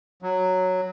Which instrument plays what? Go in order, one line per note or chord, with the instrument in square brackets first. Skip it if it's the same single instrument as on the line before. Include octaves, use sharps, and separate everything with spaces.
[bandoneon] F#3